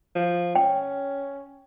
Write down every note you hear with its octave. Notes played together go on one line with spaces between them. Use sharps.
F3
C#4 G5